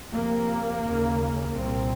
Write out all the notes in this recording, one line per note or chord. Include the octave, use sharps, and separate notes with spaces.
F2 C3 A#3
D#2 C#3
C2 A#2 C4